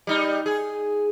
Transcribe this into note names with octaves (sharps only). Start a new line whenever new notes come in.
G3 D#4
G#4